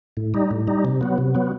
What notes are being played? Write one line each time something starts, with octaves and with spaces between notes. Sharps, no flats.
A2
G3 D#4
A2
G3 D#4
C3
F#3 B3
C3
F#3 B3